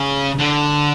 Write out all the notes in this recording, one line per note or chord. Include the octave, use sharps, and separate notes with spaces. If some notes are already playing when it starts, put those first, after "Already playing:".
Already playing: C#3
D3